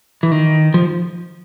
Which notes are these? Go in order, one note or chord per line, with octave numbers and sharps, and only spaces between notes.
E3
D#3
F3